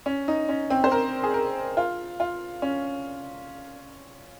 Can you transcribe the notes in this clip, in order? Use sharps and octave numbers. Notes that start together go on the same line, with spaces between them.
C#4
D#4
C#4
C4
C5
A#4
G#4
A#4
F4
F4
C#4